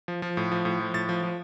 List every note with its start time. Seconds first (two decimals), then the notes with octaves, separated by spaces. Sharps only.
0.08 F3
0.22 F3
0.37 A2
0.52 F3
0.65 A2
0.80 F3
0.94 A2 A6
1.09 F3
1.23 F3